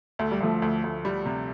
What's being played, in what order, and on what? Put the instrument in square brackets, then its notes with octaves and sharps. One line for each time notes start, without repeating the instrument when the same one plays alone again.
[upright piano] D2 [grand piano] A3
[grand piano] G3
[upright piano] D2 [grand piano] F3 A3
[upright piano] D2
D2
G3
C3